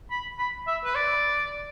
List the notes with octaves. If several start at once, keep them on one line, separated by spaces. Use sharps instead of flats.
B5
B5
E5
B4
D5